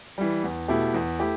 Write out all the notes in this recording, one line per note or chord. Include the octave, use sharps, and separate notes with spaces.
E3 G3
E2
B2 A3 E4 G4
E2
A3 E4 G4